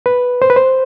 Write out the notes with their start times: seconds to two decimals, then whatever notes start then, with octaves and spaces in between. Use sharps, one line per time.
0.06 B4
0.42 C5
0.50 B4
0.56 C5